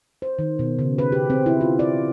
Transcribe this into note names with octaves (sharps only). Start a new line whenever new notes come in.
C5
D#3
B2
C#3
B4
G4
C4
E4
F4
D5